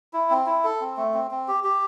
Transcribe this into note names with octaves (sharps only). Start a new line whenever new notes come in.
E4
C4
E4
A4
C4
A3
C4
C4
G4
G4